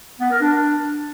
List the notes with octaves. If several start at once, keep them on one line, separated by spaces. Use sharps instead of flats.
B3
A#4
D4